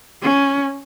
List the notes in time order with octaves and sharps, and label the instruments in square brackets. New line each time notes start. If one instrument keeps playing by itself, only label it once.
[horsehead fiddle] C#4